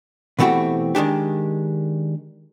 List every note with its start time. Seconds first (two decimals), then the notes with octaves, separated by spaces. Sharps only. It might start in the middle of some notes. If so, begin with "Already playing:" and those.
0.39 B2 E3 A3 C4 F#4 G4
0.95 D#3 G#3 D4 G4